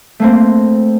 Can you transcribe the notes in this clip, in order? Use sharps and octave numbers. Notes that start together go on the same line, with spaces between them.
A3 A#3 C4